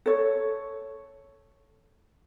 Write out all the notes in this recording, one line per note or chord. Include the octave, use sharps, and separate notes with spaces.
A4 C#5